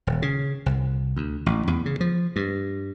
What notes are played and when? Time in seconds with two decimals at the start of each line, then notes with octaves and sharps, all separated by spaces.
0.07 D#1
0.22 C#3
0.66 C2
1.16 D2
1.46 A1
1.67 E2
1.86 C#3
2.00 F3
2.36 G2